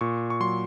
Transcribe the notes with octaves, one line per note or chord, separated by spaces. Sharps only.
A#2 C#6
C#6
F#3 C6